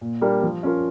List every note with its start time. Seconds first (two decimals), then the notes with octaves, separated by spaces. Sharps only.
0.01 A#2
0.21 G3 A#3 D4 G4
0.42 F3
0.63 C#4 F4 A#4